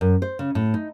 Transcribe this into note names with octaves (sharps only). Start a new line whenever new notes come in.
F#2
C5
C#3
A2
D#4